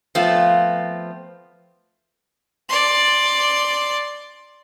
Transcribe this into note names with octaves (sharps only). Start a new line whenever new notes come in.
F3 A3 B3 C4 F4
D5 C6